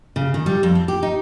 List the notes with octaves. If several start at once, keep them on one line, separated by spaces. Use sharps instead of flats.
C#3
D#3
G3
F2
C4
G4
D#4